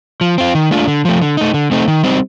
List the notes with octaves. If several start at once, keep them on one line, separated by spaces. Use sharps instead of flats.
F3
C4 F4
D#3
A3 D4 F4
D3
F3 A3
D3
A3 D#4
D3
A3 C4 D#4
D#3
G3 C4 D#4